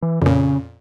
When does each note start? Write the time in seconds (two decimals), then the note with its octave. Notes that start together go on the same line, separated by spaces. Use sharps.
0.02 E3
0.22 F2 A#2 C#3 C#4